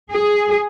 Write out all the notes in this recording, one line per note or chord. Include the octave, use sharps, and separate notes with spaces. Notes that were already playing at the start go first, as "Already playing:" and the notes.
G#4